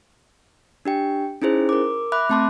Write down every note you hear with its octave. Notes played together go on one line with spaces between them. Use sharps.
D4 G4 G5
C#4 D#4 E4 G#4 C5
A#4 D6
E5 B5 D6 F#6
A3 C4 A5 C6 D6